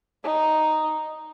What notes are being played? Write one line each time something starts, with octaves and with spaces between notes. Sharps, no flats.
D#4